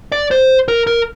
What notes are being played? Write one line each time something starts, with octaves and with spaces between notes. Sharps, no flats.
D5
C5
A#4
A#4